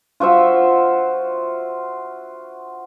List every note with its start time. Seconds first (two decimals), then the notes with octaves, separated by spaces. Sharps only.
0.20 F4 F#4 C5 E5